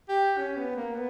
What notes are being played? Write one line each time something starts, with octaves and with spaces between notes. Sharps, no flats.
G4
C#4
B3
A#3
B3